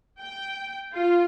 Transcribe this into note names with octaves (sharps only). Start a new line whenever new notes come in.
G5
F4